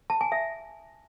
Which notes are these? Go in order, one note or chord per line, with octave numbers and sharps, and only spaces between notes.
A5
G#5
E5